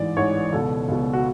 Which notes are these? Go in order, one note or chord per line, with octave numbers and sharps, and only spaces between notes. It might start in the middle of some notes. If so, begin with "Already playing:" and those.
Already playing: A1 G#2 E3 D5
A1 G#2 E3 C#5
C#2 B2 A4
C#2 B2
F#4